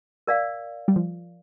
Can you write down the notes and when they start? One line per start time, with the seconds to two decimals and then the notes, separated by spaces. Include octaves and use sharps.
0.27 A#4 D5 F5
0.88 G3
0.96 F3